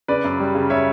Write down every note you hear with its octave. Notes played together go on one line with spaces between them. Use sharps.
C#3 B4 D5
F#2
G3
C#3
G3 C#5 E5